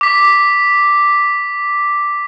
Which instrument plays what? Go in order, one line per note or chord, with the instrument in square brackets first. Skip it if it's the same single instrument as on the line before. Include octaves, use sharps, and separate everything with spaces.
[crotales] D6 B6